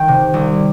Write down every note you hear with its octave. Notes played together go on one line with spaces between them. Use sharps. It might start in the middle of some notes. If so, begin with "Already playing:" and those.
Already playing: D#3 G5
C3
C2